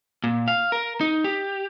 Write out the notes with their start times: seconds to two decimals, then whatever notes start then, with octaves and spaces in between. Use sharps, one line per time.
0.24 A#2
0.48 F5
0.72 A#4
1.01 D#4
1.24 G4